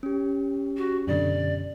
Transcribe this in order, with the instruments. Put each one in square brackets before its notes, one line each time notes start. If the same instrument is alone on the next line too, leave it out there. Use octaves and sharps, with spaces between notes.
[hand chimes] C#4 G4
[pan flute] F#4
[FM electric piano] F#2 B2 D3 [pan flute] D5